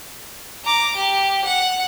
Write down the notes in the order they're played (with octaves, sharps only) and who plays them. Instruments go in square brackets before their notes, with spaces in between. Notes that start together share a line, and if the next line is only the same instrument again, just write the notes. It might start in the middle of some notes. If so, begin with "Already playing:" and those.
[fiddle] A#5 D6
G4
F#5